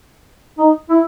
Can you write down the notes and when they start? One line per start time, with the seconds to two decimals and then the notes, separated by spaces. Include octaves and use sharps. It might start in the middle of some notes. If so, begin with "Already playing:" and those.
0.58 D#4
0.90 E4